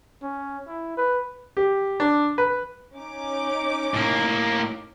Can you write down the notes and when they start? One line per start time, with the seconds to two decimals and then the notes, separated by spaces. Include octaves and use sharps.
0.23 C#4
0.68 E4
0.97 B4
1.57 G4
2.00 D4
2.38 B4
2.94 C#4 D#4 D6
3.94 A2 A#3